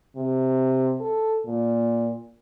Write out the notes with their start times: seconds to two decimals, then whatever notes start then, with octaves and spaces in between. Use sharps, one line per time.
0.16 C3
1.00 A4
1.45 A#2